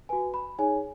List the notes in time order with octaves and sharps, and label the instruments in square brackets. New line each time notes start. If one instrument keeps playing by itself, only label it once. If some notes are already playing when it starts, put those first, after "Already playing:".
[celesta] F#4 B4 G#5
B5
D#4 G#4 C#5 G#5